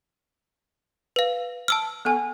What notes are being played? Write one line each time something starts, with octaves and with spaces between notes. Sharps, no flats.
B4 F5
A5 E6 F6
B3 A4 G#5